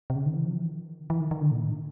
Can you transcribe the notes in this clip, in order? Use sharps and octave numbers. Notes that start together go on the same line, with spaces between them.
C3
C#3
D#3
E3
F3
E3
D#3
E3
D#3
D#3
D3
A#2
A2